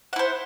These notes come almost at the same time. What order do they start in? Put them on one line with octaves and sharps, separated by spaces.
F#5 E4 C5